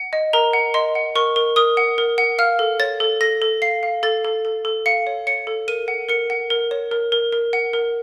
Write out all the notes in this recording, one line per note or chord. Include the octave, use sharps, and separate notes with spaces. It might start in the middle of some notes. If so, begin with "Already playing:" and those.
Already playing: F#5
D#5
A#4 A#5
F#5
D#5 C6
F#5
A#4 C#6
A#4
A#4 D#6
F#5
A#4
F#5
F5 F6
A4
C#5 A6
A4
A4 A#6
A4
F5 C7
F5
A4 A6
A4
A4
A4
F5 C#7
C#5
C#5 C#7
A4
A#4 D#7
F#5
A#4 C#7
F#5
A#4
C#5
A#4
A#4
A#4
F#5
A#4